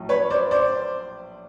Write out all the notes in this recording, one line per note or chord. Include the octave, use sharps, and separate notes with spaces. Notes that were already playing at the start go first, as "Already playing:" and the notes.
Already playing: A#1 A2 F#3
B4 C#5
C5 D5
C5 D5